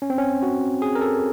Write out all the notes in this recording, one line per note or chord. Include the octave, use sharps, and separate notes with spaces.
C#4
C4
C#4
F#4
G#4
A#4
A4